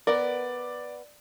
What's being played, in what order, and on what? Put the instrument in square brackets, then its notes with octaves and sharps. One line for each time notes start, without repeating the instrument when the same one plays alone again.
[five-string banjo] B3 A#4 [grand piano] D5